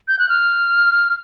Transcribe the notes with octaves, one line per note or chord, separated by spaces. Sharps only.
G6
F#6
F6